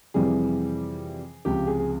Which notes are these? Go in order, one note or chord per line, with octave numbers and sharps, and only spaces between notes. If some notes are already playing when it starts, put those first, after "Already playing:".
F2 C3 E3 G3 G#4
C#2 C3 F3 C4 G4
G#4
G#4